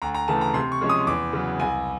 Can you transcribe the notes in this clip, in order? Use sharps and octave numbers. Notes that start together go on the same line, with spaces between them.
D2 A#5
A#5
C#3 E3 A3 A5
A#5
C3 C6
C#6
F3 G#3 C#4
D#6
E2 D6
C#3 F#3
C2 G#5